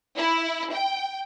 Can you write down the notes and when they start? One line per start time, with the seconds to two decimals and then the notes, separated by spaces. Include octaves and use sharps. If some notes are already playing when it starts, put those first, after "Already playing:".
0.17 E4
0.72 G5